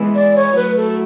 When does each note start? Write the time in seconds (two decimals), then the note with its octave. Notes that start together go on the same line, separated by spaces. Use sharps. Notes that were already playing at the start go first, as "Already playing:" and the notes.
Already playing: E3 G#3 B3 E4
0.15 D5
0.36 C#5
0.56 F#3 A3 E4 B4
0.77 A4